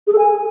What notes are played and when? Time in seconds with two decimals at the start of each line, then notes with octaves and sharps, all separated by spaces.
0.07 G#4
0.13 A4
0.18 G#5